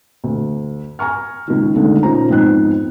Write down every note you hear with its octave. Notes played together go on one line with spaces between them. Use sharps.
D2
G#5 A#5 C#6 F6
C#2 D#3
C#2 D3 D#3 G#3 A3
A#2 C#4 D#4 F4 C5 A#5
F2 G#2 B3 C4 D#4 F#6